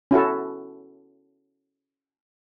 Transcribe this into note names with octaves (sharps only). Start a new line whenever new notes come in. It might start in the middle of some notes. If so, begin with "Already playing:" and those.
C#4 E4 F#4 A4